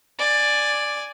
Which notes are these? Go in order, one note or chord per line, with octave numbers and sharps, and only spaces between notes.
D5 G#5